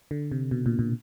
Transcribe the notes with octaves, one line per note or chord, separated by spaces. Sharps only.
D3
C3
B2
A#2
A#2